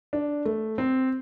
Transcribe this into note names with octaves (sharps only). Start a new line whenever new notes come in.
D4
A3
C4